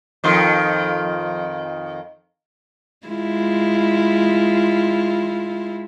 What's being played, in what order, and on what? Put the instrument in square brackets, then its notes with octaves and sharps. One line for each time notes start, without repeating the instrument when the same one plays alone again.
[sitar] F2 D#3 F4
[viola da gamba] G#3 E4 F4